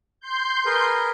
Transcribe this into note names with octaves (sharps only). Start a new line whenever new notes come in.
C6 G6
G#4 A#4 B4